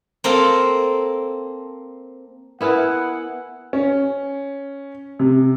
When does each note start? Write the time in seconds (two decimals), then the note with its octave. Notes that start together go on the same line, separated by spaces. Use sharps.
0.24 A#3 C4 A4 F5
2.61 B3 E4 G#4 A#4 B4 E5 F#5
3.73 C#4
5.19 C3